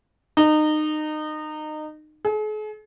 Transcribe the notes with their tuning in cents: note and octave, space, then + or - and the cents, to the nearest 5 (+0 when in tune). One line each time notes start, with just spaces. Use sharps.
D#4 -25
G#4 +45